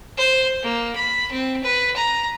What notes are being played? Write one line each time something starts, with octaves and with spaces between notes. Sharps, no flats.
C5
A#3
B5
C4
B4
A#5